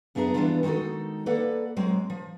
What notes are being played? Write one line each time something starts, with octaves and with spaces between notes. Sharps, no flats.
F#2 B3 D4 G#4 E5 A#5
E3 F#3 G3 B3 D4 F4
D#3 G#3 D#4 F#4 A4
A#3 A4 B4 D5 F#5
F#3 G#3 C4
F3